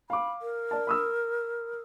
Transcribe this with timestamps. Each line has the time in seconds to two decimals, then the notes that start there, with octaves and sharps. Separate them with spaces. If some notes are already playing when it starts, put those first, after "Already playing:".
0.10 F5 B5 D6
0.42 A#4
0.71 D5 A5
0.87 B5 D#6 E6